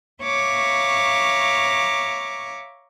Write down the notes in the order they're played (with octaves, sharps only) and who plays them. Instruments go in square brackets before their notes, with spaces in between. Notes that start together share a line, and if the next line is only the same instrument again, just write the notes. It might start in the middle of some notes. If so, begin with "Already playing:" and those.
[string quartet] C#5 E5 F5 A#5 C#6 D6